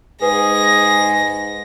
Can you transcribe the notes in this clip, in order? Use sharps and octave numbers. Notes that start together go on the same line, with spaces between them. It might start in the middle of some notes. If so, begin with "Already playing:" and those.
G#2 G#4 B4 A#6